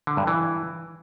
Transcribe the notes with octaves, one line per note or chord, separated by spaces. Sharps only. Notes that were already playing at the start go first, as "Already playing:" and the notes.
D3
G2
E3